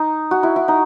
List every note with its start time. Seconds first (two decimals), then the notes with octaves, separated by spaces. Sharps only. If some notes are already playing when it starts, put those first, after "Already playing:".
Already playing: D#4
0.31 F#4
0.43 E4
0.56 E4
0.68 D#4